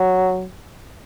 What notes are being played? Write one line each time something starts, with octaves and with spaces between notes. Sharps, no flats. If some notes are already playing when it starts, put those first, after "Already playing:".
Already playing: F#3